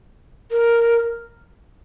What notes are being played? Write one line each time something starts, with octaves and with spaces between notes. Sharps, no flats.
A#4